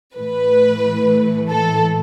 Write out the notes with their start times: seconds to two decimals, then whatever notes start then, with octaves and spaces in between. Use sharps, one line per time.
0.15 A2 E3 A3 B4
1.50 A4